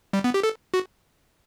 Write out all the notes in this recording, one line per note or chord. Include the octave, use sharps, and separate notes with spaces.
G3
B3
G4
A4
F#4